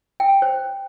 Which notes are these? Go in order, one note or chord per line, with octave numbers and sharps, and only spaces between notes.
G5
C5